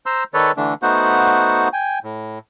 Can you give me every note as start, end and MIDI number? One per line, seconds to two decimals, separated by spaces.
0.06 0.24 72
0.06 0.24 82
0.06 0.24 84
0.06 0.24 88
0.34 0.52 51
0.34 0.52 69
0.34 0.52 71
0.34 0.52 73
0.34 0.52 74
0.57 0.74 50
0.57 0.74 52
0.57 0.74 57
0.57 0.74 62
0.83 1.69 57
0.83 1.69 59
0.83 1.69 63
0.83 1.69 66
0.83 1.69 72
0.83 1.69 78
1.73 1.99 79
1.73 1.99 80
2.04 2.39 45